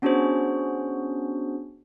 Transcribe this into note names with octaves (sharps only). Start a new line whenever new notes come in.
B3 C#4 D4 F#4 G#4 C5